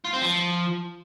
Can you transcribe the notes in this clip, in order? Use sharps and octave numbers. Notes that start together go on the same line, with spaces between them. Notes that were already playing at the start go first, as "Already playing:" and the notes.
F4
C4
F3